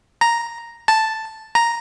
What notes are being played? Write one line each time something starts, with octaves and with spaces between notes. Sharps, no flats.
A#5
A5
A#5